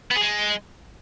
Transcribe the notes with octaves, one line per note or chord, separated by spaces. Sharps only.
B3
G#4
G#3